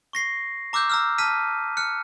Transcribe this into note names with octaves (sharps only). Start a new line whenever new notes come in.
C#6 A#6 C7
A#5 D6 E6 F#6 G6
A#5 E6 F6
A5 F6 B6 D#7
F6 F#6 C#7